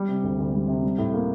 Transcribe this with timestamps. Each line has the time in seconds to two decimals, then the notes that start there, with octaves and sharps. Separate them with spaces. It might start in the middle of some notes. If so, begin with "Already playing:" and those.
Already playing: G3
0.09 C3
0.23 D2
0.39 D2
0.53 G3
0.68 C3
0.83 G3
0.98 A2
1.14 A#3